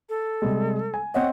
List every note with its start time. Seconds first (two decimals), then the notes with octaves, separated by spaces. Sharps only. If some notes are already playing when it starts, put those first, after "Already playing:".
0.09 A4
0.42 C3 G3 G#3
0.94 G#5
1.14 C4 C#5 D#5 F#5